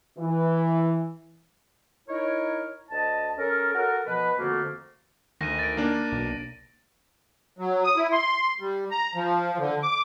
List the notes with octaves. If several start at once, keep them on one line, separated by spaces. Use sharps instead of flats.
E3
D#4 E4 A#4 C#5
D2 D#5 A5
C#4 A4 A#4
F#4 A4 A#4
B2 F3 B4
F2 D3 A3 A#3 F#4
D2 D#3 A#6 D#7
A6 D7
A#3 D4
B1
F#3
D#6
E4
C6
G3
A#5
F3
D3
D6